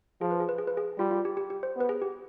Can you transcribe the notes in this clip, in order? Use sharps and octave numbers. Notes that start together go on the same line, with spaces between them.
F3 G#4
B4
G#4
B4
G#4
B4
G#4
G3 F4
F4
G4
G4
G4
C5
B3 B4
G#4
G4